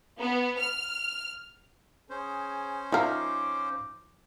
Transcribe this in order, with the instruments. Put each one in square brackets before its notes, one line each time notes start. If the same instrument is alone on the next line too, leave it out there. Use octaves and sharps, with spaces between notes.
[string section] B3
F6
[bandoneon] C#4 C5 [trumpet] G#4
[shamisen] F3 A#4 [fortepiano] D#4 E5 F5 [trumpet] D6